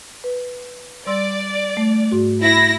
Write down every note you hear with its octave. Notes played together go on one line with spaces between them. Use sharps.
B4
G3 D5 C6 E6
A3
G#2 F#4
E4 A#6